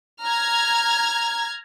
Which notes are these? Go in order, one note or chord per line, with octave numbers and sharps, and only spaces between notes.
A#5 F6 G#6